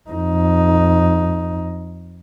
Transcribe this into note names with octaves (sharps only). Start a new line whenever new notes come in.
F2 D#4